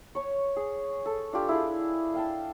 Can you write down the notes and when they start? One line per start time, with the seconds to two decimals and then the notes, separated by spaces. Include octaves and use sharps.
0.15 C#5 C#6
0.57 G#4
1.06 A4
1.33 D4 F4 G4
1.49 E4 G#4
2.14 F5 G5 A5